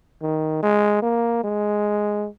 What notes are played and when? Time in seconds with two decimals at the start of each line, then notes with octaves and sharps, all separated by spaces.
0.22 D#3
0.63 G#3
1.02 A#3
1.44 G#3